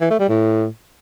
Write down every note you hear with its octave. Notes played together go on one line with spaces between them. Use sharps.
E3
A3
G3
A2